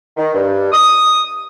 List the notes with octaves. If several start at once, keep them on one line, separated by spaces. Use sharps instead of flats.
D#3
G2
D#6